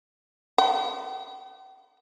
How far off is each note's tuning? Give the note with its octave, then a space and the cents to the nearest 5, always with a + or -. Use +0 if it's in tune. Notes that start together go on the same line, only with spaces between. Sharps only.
G5 -40